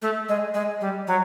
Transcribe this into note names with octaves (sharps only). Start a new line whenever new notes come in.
A3
G#3
G#3
G3
F#3